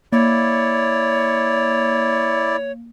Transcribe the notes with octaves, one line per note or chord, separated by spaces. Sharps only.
A#3 E4 C#5 D5